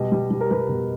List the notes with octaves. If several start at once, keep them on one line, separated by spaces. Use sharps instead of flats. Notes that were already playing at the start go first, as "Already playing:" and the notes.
Already playing: B2 G3 D#5
G3
G3
A#4
G3 B4
B2